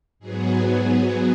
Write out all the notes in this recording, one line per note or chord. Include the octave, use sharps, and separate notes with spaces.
G#2 F#3 B3 G#4